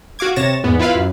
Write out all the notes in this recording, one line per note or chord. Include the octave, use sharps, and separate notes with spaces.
F#4 F5 D6 G#6
C3 C#5 A6 A#6 E7
E2 G#2 E3 B3
E4 F4 B4 F5
F#2